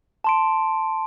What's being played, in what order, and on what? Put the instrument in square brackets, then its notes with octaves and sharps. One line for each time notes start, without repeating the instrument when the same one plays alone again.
[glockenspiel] A5 C6 D7